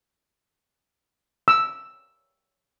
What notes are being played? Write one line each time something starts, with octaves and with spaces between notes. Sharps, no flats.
E6